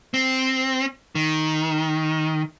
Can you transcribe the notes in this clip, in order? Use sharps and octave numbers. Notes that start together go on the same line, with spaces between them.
C4
D#3